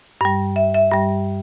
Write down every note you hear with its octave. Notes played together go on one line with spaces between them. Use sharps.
G2 G3
E5
E5
G2 G3